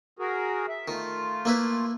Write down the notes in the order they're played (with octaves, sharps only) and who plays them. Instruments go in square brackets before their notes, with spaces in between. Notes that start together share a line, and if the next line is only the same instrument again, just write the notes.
[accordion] F#4 G#4 A#4
E5
[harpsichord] D#3 [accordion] A3 F4
[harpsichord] A#3 E4 B4